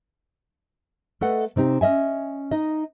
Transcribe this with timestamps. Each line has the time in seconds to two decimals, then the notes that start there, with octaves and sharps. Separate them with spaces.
1.21 A3 A4 B4 D#5 F#5
1.56 C3 C4 D#4 G4
1.81 C#4 D#5 E5 G#5
2.51 D#4 D#5